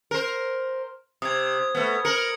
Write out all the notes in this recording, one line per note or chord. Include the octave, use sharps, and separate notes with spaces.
A#4 C5
C3 D#6 G#6
A3 B3
A#4 C#7 F#7